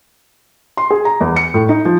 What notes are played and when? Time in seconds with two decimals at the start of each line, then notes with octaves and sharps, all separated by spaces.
0.77 C6
0.91 G#4
1.05 A#5
1.20 E2
1.36 C#7
1.54 A2
1.69 D#4
1.85 F3